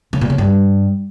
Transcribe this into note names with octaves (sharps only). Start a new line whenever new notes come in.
C#3
A#2
C#3
G2